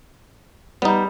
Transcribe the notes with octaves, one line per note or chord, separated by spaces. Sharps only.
G3 B3 D#4